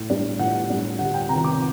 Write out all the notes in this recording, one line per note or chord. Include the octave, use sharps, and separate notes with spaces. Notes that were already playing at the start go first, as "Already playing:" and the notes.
Already playing: A2
G3 D4
A2 F#5
G3 D4
D2 F#5
G5
C3 D#3 A#5
D6